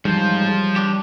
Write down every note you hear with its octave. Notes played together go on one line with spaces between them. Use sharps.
G#2 E3 F3 G3
D4 G4